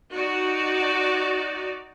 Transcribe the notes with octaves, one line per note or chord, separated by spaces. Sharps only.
D#4 F#4 D5